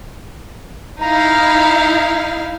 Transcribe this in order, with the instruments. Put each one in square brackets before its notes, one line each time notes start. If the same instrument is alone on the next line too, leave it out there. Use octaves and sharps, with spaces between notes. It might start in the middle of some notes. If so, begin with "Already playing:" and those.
[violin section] D#4 E4 F5 [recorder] A#5